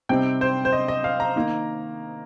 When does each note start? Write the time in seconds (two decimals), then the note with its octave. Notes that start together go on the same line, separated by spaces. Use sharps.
0.09 C3 G3 C4 D#4 G5
0.41 C5
0.65 C5
0.73 D#5
0.88 D#5
1.04 F5
1.20 A#5
1.36 D#3 A#3 D#4